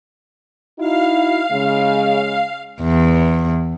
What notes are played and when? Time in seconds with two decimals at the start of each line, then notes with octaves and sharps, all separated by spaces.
0.79 D#4 E4 F#4 F5
1.51 C#3 G#3
2.82 E2